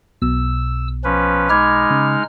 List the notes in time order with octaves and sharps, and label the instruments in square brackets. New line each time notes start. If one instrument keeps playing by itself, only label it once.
[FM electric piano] B1 B2 [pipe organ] E6
[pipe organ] F3 C#4 B4
[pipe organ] G#3 D#4 F6 [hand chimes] B5 D6 G#6
[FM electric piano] C#3